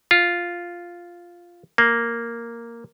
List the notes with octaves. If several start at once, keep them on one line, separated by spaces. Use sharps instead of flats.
F4
A#3